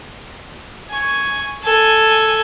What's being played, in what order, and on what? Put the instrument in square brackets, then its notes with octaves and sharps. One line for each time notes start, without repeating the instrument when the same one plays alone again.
[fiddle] G#5 C#6
A4 G#5